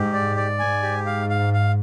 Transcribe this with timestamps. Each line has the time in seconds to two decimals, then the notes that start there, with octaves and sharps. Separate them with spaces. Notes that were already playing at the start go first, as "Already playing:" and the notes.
Already playing: G#2 G4
0.13 D5
0.37 D5
0.59 G#2 G#5
0.83 G4
1.06 F5
1.29 F5
1.53 F5